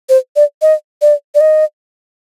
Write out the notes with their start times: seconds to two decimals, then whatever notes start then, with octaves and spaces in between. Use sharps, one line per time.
0.09 C5
0.36 D5
0.62 D#5
1.02 D5
1.35 D5
1.41 D#5